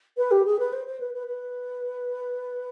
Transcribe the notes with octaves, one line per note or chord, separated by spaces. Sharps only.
B4
G4
G#4
B4
C5
C5
B4
B4
B4